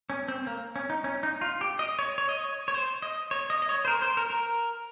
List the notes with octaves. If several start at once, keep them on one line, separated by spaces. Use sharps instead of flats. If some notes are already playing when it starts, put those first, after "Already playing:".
C#4
C4
A#3
C#4
D#4
C#4
D#4
F4
G4
D#5
C#5
C#5
D#5
C#5
C#5
C5
D#5
C#5
D#5
D#5
C#5
C5
A#4
C5
A#4
A#4